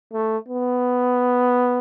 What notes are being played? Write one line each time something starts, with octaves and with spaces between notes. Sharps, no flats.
A3
B3